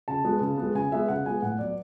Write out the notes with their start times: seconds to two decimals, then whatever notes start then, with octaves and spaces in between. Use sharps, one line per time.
0.08 C#3 A5
0.25 G#3 B3
0.41 C#3
0.58 G#3 B3
0.74 C#3 G#5
0.92 G#3 B3 E5
1.08 C#3 F#5
1.26 G#3 B3 G#5
1.42 A2 F#5
1.59 F#3 B3 D5